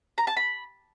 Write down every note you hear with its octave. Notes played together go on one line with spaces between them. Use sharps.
A#5
A5
B5